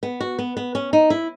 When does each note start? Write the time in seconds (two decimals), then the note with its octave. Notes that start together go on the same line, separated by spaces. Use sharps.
0.03 B3
0.20 F#4
0.39 B3
0.57 B3
0.75 C#4
0.93 D#4
1.10 E4